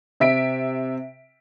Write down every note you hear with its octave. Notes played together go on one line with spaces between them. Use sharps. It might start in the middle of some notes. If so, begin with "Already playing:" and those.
C3 E5 B6 D7